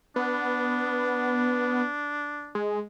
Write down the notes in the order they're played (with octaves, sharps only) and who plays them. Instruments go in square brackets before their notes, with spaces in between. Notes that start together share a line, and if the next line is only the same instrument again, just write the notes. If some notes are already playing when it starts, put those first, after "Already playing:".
[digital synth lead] B3 [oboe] D4
[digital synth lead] G#3